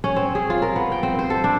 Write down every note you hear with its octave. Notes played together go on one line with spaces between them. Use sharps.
C#4
C4
G#4
F4
A#4
B3
G5
C4
C5
A4
D4